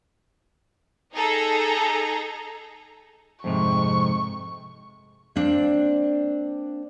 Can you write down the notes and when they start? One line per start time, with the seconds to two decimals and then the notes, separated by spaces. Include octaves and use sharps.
1.13 D#4 G#4 A4 A#5
3.44 F2 G#2 C3 C#6
5.36 A#3 C4 D4